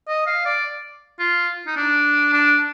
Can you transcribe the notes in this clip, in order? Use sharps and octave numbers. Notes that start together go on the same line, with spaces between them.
D#5
F5
D5
F4
D#4
D4
D4